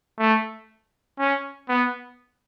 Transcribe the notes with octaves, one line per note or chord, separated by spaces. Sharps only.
A3
C#4
B3